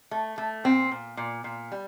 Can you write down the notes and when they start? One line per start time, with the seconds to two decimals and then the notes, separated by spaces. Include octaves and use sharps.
0.11 A3
0.38 A3
0.64 A#2 C4
0.91 A#2
1.17 A#2
1.44 A#2
1.72 G3